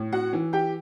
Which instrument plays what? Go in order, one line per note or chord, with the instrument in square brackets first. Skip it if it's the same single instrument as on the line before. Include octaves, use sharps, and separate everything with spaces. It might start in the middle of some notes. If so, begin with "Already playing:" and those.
Already playing: [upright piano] A2
F#4 F#5
E3
G4 G5